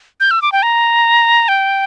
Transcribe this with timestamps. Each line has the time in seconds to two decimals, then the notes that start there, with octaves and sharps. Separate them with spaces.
0.20 G6
0.31 E6
0.42 D6
0.52 G5
0.63 A#5
1.48 G5